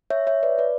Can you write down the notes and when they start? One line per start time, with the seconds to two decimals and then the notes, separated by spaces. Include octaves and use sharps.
0.10 C#5 E5
0.27 C#5 E5
0.43 B4 D5
0.58 B4 D5